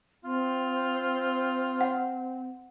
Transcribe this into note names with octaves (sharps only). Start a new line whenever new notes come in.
C4 F4
F#5